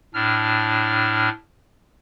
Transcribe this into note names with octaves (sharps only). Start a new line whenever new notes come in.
A2 D4 F6